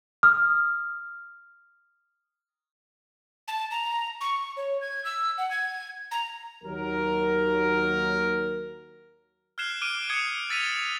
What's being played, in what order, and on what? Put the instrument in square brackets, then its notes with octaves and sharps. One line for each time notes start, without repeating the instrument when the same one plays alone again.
[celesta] D#6 F6
[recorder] A5
A#5
C#6
C#5
G#6
E6
F#5
G#6
A#5
[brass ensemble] D#2 F#3 A#4
[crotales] F6 F#6 G#6 C7 E7 G7
D6 F6 D7 D#7 G7
D#6 G#6 C#7 E7
E6 A6 B6 D7 D#7 F7